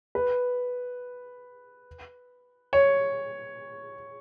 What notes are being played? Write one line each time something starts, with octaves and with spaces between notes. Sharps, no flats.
B4
C#5